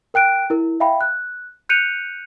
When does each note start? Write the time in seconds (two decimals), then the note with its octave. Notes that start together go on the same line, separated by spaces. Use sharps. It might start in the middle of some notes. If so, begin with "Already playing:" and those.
0.14 A#4 G5 F#6 D7
0.50 E4 A#4
0.80 E5 F5 G5 B5
1.01 F#6
1.69 F#6 G6 C#7 D#7 F7